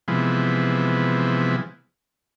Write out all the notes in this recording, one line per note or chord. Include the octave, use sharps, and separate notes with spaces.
C3 E3 F3 G#3 B3